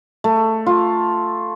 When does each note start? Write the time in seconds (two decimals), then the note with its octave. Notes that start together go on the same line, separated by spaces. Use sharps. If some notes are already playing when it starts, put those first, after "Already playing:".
0.24 A3
0.66 F4